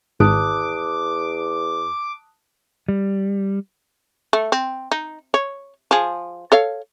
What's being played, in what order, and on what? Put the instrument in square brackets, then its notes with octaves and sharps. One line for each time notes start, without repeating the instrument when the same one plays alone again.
[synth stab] G#1 [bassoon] E2 [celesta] A5 D#6 F#6 [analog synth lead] D6
[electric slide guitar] G3
[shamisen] A3
C4
D#4
C#5
F3 G#4
A4 C#5 F5